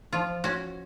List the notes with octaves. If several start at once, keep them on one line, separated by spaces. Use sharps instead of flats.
F3 F4
C#4 F#4